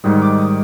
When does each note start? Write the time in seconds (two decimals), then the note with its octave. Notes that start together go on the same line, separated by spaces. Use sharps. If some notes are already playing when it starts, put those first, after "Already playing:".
0.04 G#2 D#3 G3 D#6
0.22 D6
0.40 D#6